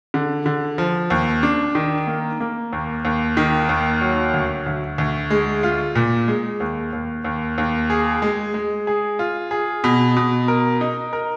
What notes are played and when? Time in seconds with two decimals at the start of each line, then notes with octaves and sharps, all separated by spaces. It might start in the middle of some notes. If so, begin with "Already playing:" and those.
0.14 D3
0.46 D3
0.78 F3
1.10 D#2
1.43 D4
1.75 D#3
2.07 A#3
2.40 A#3
2.73 D#2
3.05 D#2
3.37 D#3
3.69 D#2
4.01 F#3
4.34 D2
4.66 D2
4.98 D2
5.30 G#3
5.63 F4
5.95 A#2
6.28 G#3
6.60 D#2
6.93 D#2
7.25 D#2
7.58 D#2
7.90 G#4
8.22 G#3
8.54 G#3
8.87 G#4
9.19 F4
9.51 G#4
9.84 B2
10.16 B2
10.48 A#4
10.81 D#4
11.13 A#4